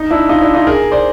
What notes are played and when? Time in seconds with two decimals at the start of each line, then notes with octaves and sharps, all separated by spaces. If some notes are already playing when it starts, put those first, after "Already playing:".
Already playing: D#4
0.11 D4 E4
0.29 D#4 F4
0.42 D4 E4
0.54 D#4 F4
0.67 G#4 A#4
0.92 C5 D5